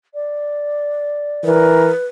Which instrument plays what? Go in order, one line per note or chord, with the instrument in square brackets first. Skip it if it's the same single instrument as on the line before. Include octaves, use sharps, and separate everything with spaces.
[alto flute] D5
[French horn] E3 [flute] A#4 [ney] B4